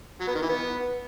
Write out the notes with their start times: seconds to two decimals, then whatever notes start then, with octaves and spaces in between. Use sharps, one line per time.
0.20 F#3
0.28 B3
0.35 D#3
0.42 E3
0.49 B3